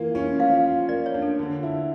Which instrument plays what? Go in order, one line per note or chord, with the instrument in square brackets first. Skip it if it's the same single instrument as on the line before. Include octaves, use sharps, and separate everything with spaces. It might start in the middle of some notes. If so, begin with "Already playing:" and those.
Already playing: [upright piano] E3 A#3 F4
C#4
[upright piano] F3 [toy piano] F5
[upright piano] F4
[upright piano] A#3 [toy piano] D5
[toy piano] C#5
[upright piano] D4
[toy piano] A4
[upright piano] D3
E4